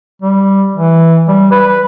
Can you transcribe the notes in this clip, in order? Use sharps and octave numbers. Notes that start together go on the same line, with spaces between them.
G3
E3
G3
B4